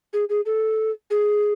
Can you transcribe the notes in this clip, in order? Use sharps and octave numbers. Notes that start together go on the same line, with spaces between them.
G#4
G#4
A4
G#4